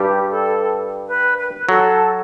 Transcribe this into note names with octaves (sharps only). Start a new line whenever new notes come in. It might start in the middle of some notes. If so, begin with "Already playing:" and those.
Already playing: G2 G3 G4
A4
B4
B4
F#3 A4